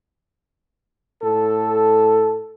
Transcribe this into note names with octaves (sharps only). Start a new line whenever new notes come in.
A2 A4